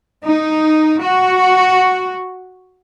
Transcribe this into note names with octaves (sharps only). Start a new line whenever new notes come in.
D#4
F#4